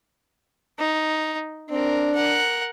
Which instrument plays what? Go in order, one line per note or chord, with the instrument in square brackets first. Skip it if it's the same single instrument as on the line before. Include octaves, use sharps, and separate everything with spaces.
[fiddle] D#4
[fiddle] C4 A#4 [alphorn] D4
[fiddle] A#4 F#5